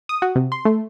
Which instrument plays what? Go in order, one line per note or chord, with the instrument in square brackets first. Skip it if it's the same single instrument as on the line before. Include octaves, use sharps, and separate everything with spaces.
[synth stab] D#6
F#4
C3
C6
A3